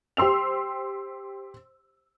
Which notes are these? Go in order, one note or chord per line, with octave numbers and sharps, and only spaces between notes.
G4 C5 C6 E6 F7